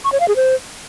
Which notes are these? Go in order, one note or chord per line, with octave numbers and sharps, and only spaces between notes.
C#6
C#5
F5
G#4
C5